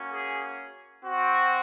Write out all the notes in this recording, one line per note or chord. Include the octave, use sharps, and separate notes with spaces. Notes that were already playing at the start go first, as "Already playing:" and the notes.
Already playing: A#3 C#4 F#4
G#4
C4 F#4